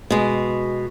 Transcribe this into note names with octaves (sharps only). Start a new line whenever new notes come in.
B2 G#3